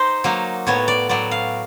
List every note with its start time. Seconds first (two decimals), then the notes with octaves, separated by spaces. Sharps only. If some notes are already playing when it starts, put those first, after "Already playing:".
Already playing: D#4 C5
0.24 F#3 A#3 D#4
0.67 A2 F#3 B3 C#5
0.88 D5
1.09 A2 F#3 B3 D5
1.31 F5